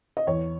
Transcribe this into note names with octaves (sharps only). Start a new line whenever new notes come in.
D#5
E2 C#5